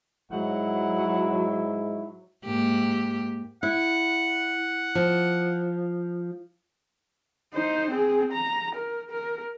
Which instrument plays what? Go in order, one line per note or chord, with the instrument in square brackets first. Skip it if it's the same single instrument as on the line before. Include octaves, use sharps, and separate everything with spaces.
[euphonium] G#2 [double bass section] F#3 [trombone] E4 [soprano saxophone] F#5
[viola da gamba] G#2 A#3 G4
[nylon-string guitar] E4 [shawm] F#5
[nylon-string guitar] F3
[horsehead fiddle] D#4 C5
C4 G#4
A#5
A#4
A#4